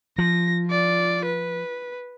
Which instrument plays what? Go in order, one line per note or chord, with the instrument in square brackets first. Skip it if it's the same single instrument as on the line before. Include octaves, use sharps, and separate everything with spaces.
[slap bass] F3 [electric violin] A#6
[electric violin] F4 D5
B4